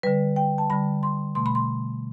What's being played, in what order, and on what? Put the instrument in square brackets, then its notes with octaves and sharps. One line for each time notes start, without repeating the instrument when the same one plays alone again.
[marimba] D3 G3 B4
G5
A5
D3 G3 B5
C6
B2 A3 C6
B5
C6